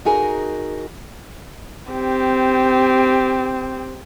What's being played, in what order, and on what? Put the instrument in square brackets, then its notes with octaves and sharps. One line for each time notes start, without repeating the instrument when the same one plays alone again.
[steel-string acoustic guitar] D#4 F#4 G#4 A#4
[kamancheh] C4 G4